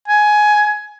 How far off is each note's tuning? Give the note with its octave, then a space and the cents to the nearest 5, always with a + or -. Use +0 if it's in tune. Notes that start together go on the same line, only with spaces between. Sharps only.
G#5 +15